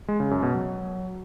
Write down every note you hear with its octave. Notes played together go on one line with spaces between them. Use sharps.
G#3
C#3
F#2
B2
F#3